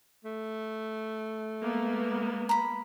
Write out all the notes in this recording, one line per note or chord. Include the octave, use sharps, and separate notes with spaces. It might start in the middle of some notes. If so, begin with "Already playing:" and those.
A3
G#3 A#3 B3
A#5 B5